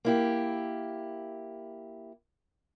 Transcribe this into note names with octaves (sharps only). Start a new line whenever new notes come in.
A#3 E4 G4